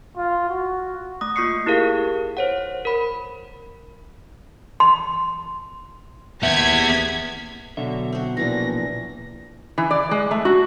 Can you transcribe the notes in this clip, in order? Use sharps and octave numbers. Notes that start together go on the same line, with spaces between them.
F4
F#4
A3 D#6
A#3 F4 C#6 D#6 C7 C#7
E4 G4 G#4 A#4 F5
C5 C#5 F#5
A#4 B5
C6
D#2 B3 E5 G#6 B6
B2 D3 F#3 E5
C4 F#4
A#1 A#2 E3 D4 A#6
E3
D5
G#3
A3
F#4